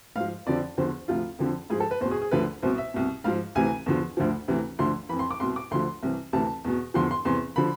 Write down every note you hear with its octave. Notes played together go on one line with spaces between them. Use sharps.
G#2 F3 F5
F2 D3 F3 D5
E2 D3 F3 C5
D2 C3 F3 F4
F2 D3 F3
G#2 F3 G#4
A4
B4
E2 B2 C5
G#4
G#4
D2 D3 F3 B4
C2 B2 C5
E5
C2 B2
G#2 F3 F5
D2 C3 E3 G#5
E2 D3 F3
D2 D3 F3
D2 C3 E3
D2 D3 F3 C6
F2 E3 B5
C6
D6
C2 B2 C6
D6
D2 D3 F3 C6
C2 C3 E3
D2 C3 E3 A5
E2 B2
E2 D3 F3 C6
C6
E2 C3 E3 C6
D3 F3 B5